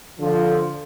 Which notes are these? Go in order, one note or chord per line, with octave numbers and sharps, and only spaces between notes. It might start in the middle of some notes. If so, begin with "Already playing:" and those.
D3 F3